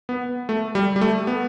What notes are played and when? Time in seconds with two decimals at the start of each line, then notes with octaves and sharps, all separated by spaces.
0.09 B3
0.49 A3
0.75 G3
0.96 G3
1.01 A3
1.27 B3